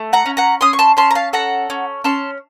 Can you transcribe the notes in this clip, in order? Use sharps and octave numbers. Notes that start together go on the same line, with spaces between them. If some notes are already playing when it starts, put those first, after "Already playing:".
Already playing: A3
F#5 A#5
C#4
F#5 A#5
C#4 C6 D#6
C#6
A5 C6
C#4 A5 C6
A#5
F5 A5
A4 F#5 A#5
C#4
C#4 A5 C6